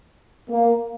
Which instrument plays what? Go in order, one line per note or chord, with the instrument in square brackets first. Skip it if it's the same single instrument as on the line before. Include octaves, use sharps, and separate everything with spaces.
[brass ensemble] A#3